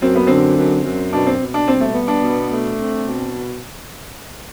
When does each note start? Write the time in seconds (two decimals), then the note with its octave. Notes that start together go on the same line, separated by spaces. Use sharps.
0.02 F#2 C4
0.15 B3
0.27 D3 C4
0.57 F#2
0.84 F#2
1.13 B2 D4
1.26 C4
1.40 B2
1.54 D4
1.67 G3 C4
1.80 A3
1.94 B3
2.08 D4
2.22 B2
2.49 A3
2.78 C4
3.04 B2